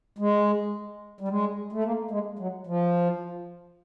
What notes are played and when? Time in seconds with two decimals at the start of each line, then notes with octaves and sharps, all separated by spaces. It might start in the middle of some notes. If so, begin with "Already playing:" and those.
0.18 G#3
1.21 G3
1.28 G#3
1.73 A3
1.84 A#3
2.11 G#3
2.39 F#3
2.67 F3